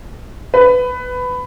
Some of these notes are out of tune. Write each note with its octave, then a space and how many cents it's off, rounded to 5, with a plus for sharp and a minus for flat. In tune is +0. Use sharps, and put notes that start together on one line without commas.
B4 +15